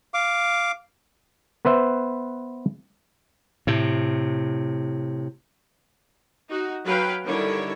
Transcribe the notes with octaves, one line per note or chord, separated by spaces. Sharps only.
F5 D6
B3 B4 C5 E5
A2 C3
D#4 F#4
F#3 B4 F5 G5
D3 D#3 G3 E4 A4 C#5